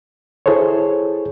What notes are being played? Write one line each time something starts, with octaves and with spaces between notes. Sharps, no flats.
E4 G#4 A4 C5 C#5